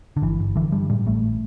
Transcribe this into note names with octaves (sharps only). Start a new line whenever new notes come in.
D3
G1 E3
G1
D3 E3
G2 G3
A2 G3
A1 A3